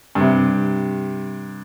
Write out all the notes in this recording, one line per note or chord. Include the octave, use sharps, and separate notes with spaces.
G2 C3